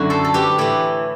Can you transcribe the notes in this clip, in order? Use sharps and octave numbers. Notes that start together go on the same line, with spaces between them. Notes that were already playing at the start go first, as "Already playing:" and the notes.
Already playing: F#2 D3 E4 F#4
A4 C5
A4
G4 B4
A2 E3 E4 G4